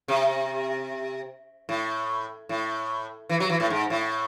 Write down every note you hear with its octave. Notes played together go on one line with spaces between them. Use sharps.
C3
A2
A2
E3
F#3
E3
A2
G#2
A2